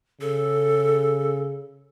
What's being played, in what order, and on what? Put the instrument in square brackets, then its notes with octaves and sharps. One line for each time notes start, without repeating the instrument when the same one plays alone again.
[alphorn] C#3 [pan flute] A4